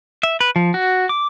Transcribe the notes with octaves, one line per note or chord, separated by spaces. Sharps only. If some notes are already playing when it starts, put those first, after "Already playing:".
E5
B4
F3
F#4
D6